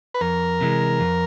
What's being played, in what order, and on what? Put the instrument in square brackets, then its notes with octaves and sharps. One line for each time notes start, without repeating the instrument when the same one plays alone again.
[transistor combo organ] B4
[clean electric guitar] F2 [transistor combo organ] A#4
[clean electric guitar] C3 E3 G#3
F2